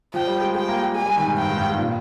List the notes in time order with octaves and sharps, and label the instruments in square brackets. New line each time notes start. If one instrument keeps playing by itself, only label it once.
[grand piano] F3 [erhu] G5
[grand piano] G3
G#3
[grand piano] G#3 [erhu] G5
[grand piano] A#3
G#3
[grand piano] G#3 [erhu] G#5
[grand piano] G3
D#3
G#2
[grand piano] G2 [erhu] G5
[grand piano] G#2
G2
G#2
A#2